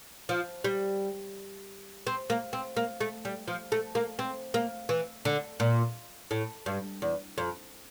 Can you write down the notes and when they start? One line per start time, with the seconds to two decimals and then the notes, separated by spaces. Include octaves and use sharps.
0.29 F3
0.64 G3
2.07 C4
2.30 A#3
2.53 C4
2.77 A#3
3.01 A3
3.25 G3
3.48 F3
3.72 A3
3.95 A#3
4.19 C4
4.54 A#3
4.89 E3
5.25 D3
5.60 A#2
6.31 A2
6.66 G2
7.02 E2
7.38 F2